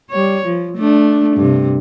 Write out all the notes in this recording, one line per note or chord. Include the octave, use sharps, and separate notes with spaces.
G3 C#5
F3
A3 D4
G2 C3